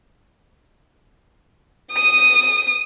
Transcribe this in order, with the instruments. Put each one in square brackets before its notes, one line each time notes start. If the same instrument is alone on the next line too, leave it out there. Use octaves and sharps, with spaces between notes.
[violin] D#6 D#7